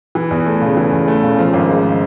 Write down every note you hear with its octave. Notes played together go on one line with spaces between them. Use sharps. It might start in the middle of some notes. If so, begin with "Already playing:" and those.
E3
E2
A3
C#3
E3
E2
A3
C#3
F3
G#1
G#3